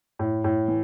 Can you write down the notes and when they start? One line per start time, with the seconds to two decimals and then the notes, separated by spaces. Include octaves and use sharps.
0.19 A2
0.44 A2
0.68 E3